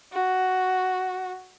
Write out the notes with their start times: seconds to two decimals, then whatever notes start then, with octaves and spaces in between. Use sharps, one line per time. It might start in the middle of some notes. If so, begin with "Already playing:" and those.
0.13 F#4